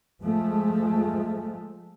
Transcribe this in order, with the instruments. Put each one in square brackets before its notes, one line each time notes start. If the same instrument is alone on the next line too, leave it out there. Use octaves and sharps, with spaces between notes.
[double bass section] F3 G#3 A3